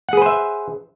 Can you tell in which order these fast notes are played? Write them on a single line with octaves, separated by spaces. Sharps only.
F#5 G#4 B4 C5 E5